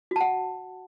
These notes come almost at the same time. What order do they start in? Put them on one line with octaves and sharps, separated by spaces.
F#4 A5 F#5